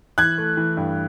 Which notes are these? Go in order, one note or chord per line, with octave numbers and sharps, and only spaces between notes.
E3 F#6 G#6
A3
E3
G2